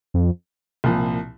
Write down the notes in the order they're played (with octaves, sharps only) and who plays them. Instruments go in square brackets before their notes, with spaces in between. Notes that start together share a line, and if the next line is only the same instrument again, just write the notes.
[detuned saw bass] F2
[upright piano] C2 A#2 F3